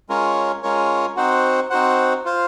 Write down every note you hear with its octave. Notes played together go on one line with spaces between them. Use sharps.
G#3 C#4 F4 A#4 C#5
G#3 C#4 F4 A#4 C#5
C4 D#4 F#4 C5 F#5
C4 D#4 F#4 C5 F#5
F4 C5 F5